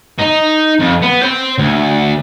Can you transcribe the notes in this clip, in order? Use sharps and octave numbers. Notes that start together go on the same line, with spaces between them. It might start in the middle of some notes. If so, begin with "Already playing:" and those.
D#4
F2
B3
C5 G5
D2